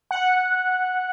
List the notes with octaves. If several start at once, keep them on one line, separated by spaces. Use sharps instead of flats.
F#5